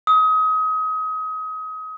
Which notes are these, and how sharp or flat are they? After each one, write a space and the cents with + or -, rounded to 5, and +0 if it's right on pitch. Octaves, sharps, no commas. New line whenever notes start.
D#6 +30